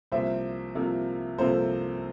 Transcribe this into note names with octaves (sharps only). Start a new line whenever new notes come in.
C2 C3 F3 A#3 C5 E5
C2 C3 F3 A#3
C2 C3 F3 A#3 A4 C5